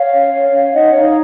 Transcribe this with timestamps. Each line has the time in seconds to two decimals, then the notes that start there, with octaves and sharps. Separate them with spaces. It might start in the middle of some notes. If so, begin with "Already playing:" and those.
Already playing: C#5 F5
0.13 C#4
0.33 C#5
0.53 C#4
0.73 D#4 D#5 F#5
0.93 D#4 C#5 F5